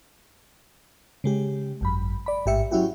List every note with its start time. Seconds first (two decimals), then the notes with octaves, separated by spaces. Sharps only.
1.24 C#3 G#3 G4
1.81 G#1 F#2 B5
2.26 D5 B5
2.46 A1 G#2 G4 E5 C#7
2.71 F#3 C#4 E4 F#4 G4